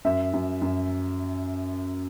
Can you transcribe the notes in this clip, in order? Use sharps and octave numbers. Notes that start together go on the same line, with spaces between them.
F#2 E5
F#2
F#2